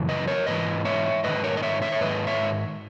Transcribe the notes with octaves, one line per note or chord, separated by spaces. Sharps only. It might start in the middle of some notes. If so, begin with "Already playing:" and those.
Already playing: F#2 C#3 E3
B4 D#5
A#4 C#5
G#2 E3 B4 D#5
C#5 E5
G#2 D#3 B4 D#5
A#4 C#5
D#5
C#5 E5
C#5 E5
C#5
G#2 D#3 B4 D#5
C#5 E5